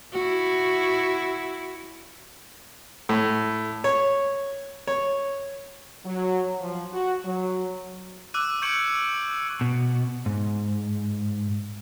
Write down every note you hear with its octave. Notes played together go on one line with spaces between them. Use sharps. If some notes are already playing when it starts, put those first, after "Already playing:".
E4 F#4
A2
C#5
C#5
F#3
F3
F#4
F#3
D6 E6 F#6 D#7
C#6 G6 G#6 C#7 D7 F#7
B2
G#2